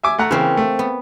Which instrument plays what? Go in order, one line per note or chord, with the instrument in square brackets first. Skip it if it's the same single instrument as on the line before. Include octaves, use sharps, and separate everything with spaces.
[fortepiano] E5 G#5 D6
A3 F#5 A#5
[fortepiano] C#3 E3 [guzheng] A#3 C4
[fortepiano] A3
[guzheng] B3